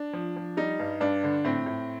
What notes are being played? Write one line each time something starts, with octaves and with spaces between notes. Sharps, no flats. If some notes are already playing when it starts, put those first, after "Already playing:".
Already playing: D4
F3
F3
G3 D#4
G2
G2 D4
D3
A2 C4
A2